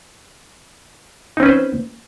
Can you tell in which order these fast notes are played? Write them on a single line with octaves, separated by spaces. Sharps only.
D#4 C4 C#4 B4 C5